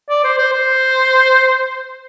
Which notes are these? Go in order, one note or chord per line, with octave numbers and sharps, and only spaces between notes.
D5
C5
C5
C5